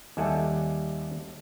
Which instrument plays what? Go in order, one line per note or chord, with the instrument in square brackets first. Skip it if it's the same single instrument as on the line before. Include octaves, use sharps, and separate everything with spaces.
[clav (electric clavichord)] D#2 G3 A4 E5 F#5 G#5